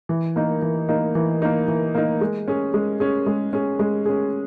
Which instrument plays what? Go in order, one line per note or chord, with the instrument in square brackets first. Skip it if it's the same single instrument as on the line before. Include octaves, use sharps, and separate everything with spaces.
[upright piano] E3
A#3 D#4
E3
A#3 D#4
E3
A#3 D#4
E3
A#3 D#4
G#3
C#4 G#4
G#3
C#4 G#4
G#3
C#4 G#4
G#3
C#4 G#4